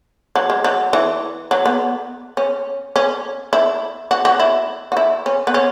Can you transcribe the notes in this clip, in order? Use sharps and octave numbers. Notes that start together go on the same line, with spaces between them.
F#3
G#3
F#3
E3
F#3
B3
C#4
C#4
E4
F#4
F#4
E4
F#4
E4
C#4
B3
C#4